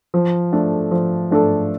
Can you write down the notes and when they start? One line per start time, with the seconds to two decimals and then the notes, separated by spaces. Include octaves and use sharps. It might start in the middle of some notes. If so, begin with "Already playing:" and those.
0.14 F3
0.53 A3 D4 A4
0.91 F3
1.31 A3 D4 A4